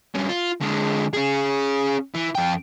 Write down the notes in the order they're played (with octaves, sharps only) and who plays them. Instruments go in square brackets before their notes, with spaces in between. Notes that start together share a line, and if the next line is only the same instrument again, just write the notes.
[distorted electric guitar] G2 C#4
F4
D3 G#3
C#4 G#4
E3
F2 G5